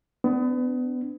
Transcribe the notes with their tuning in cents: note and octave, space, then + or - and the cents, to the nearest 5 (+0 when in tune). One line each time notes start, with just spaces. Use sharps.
B3 +30 D4 +0